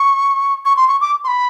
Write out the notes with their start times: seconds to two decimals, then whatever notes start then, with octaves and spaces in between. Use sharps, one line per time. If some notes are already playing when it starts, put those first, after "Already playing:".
Already playing: C#6
0.65 C#6
0.77 C6
0.88 C#6
1.01 D6
1.24 C6
1.28 B5